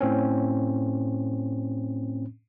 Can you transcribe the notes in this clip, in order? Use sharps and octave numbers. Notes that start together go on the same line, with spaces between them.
A2 C4 C#4